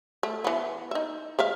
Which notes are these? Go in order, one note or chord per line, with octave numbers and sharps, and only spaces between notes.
A3
E3 B3
D#4 E5
G#3 E5 F5